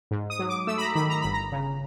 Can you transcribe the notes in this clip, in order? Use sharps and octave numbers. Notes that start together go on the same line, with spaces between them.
G#2
D#6
F#3
D6
A3 E6
B5
A#5
D#3 B5
A#5
G1 B5
A#5
C#3